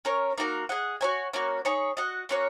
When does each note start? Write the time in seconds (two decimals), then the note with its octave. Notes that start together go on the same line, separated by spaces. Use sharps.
0.05 C#4 A#4 C#5
0.38 A#3 D#4 F#4 A#4
0.69 G#4 D#5 F#5
1.01 F#4 A#4 C#5 G#5
1.33 A#3 C#4 F#4 C#5
1.65 D#4 G#4 C#5
1.97 F#4 D#5 F#5
2.29 A#3 C#4 F#4 C#5